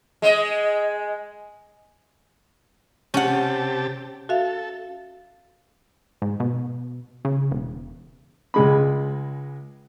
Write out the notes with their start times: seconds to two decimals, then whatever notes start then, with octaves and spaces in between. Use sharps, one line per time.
0.22 G#3 D#5
3.14 C3 C#4 G4 F#5 A5
4.29 F#4 A4 E5 F5
6.22 G#2
6.40 B2
7.25 C#3
7.52 E1
8.54 C#2 G#3 B5